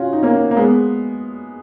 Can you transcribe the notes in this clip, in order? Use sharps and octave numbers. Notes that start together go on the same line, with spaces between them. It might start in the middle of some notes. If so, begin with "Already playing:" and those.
Already playing: C#4 F4 F#4
D#4
A#3 C#4
A#3
G#3 B3